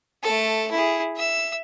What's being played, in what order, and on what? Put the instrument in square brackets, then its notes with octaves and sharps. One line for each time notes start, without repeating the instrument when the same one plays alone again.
[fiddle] A3 A4
E4 G#4
E5 E6